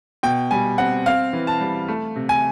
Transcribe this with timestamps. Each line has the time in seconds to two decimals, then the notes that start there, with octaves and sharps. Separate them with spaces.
0.23 B2 G5
0.51 G3 G#5
0.78 C4 F#5
1.06 C4 F5
1.33 E3
1.47 A5
1.61 G3
1.88 A3
2.16 C3
2.29 G#5